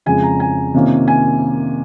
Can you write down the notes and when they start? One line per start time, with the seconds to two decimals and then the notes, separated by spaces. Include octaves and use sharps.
0.06 F2 C#3 G#3 G#5
0.23 A#5
0.40 G#5
0.74 C3 D#3 A#3 C#4 F4
1.08 G#5